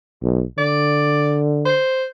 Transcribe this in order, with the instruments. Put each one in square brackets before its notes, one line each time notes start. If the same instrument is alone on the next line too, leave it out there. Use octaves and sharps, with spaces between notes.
[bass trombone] B1
[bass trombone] D3 [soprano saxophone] D5
[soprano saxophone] C5